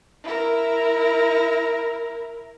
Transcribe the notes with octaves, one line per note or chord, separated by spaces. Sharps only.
E4 A#4